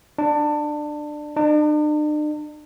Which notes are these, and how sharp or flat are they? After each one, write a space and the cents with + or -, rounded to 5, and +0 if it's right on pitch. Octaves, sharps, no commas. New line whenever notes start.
D4 +20
D4 +45